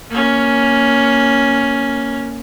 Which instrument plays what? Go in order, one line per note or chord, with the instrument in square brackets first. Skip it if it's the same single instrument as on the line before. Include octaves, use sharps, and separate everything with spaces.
[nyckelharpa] A#3 C#4